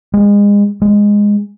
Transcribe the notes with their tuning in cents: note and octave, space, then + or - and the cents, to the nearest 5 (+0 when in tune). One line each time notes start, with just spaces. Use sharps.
G#3 -30
G#3 -10